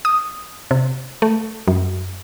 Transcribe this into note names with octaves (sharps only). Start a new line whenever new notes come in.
D#6
C3
A3
F#2